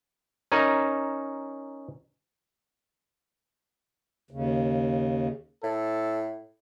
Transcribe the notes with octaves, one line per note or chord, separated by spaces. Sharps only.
C#4 D#4 A#4
D#2 C#3
A2 A4